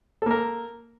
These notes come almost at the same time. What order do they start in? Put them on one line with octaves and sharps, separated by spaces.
A4 A#3 A#4